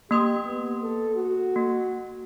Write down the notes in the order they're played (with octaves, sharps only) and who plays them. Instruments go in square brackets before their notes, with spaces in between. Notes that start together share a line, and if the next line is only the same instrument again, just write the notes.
[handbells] A#3 C6 D#6 [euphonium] G4
[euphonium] B3
A4
F#4
[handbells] A#3